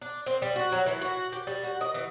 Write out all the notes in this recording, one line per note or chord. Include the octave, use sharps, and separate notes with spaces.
D4
C4
G3
F#4
F#3
E3
F#4
G4
G3
F#4
D#5
E3